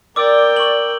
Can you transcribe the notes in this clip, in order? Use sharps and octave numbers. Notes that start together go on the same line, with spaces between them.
A#4 D5 G5 D6 E6
C#6 F#7